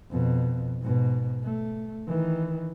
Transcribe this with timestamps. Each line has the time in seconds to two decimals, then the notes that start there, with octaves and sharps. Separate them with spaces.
0.11 F2 B2
0.81 G#2 B2
1.44 A3
2.08 D#3 E3